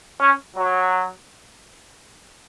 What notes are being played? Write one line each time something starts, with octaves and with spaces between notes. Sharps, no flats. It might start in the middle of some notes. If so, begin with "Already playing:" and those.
C#4
F#3